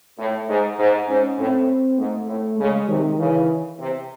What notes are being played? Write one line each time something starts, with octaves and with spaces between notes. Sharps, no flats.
A2
G#2
G#2
G#2 C#4
A2 C4
G#2 A3
A2
C#3 G#3
C3 D#3
C#3 E3
C3